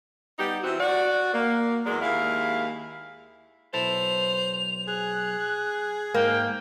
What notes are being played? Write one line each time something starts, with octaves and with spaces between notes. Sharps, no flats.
G3 B3 D#4 G4
E3 G3 C4 E4 F#4
F#4 D5
A#3
E2 F#3 G#3 G#4 A#4 D5
D#2 G#3 E4 F5
B1 E4 A4 C5 F7
G#4 F#6
G#2 A#3 G5